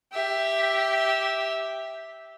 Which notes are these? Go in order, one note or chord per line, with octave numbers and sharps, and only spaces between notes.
G4 E5